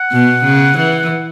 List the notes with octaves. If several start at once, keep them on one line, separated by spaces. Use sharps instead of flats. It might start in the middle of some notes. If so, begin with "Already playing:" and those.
Already playing: F#5
B2
C#3
E3 F#5
F#5